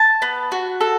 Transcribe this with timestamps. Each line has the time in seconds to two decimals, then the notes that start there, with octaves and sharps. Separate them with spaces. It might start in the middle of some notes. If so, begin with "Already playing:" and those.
Already playing: A5
0.22 B3
0.52 F#4
0.81 A4